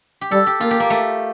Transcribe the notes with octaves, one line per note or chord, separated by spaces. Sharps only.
G4
G3 A4
G4
A#3 F4
G4
A#3
A3